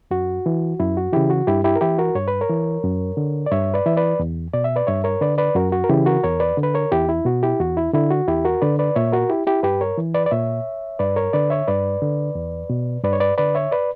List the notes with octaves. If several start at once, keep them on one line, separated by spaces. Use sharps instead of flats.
F#2 F#4
E3
F#2 E4
F#4
C#3 E3 E4 G4
F#4
G2 E4 G4
E4 G4
A#4
E3 E4 G4
F#4 A#4
G2 C#5
B4
A#4 C#5
E3
F#2
D3
D5
G2 C#5 E5
B4 D5
E3 E5
B4 D5
E2
B2 D5
E5
B4 D5
G2 C#5 E5
A#4 C#5
D3 B4 D5
B4 D5
F#2 F#4 A#4
F#4
A#4
C#3 E3 E4 G4
F#4 A#4
E2 A#4 C#5
B4 D5
D3
B4
A#4 C#5
E2 E4 G4
E4
B2 F#4
E4 G4
E2 F#4
E4
D3 E4
F#4
E2 E4 G4
F#4 A#4
D3 B4 D5
B4 D5
A#2 C#5 E5
F#4 A#4
E4 G4
E4 G4
G2 G4 B4
A#4 C#5
E3
B4 D5
D5
A#2 C#5 E5
G2 B4 D5
A#4 C#5
D3 B4 D5
C#5 E5
G2 B4 D5
D3
E2
B2
G2 B4 D5
C#5
B4 D5
D3 B4 D5
C#5 E5
B4 D5